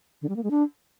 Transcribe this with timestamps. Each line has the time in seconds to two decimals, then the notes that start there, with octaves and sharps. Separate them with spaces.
0.22 D3
0.29 G3
0.36 A#3
0.43 G#3
0.50 D4